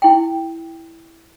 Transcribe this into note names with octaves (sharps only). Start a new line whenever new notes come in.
E4 G5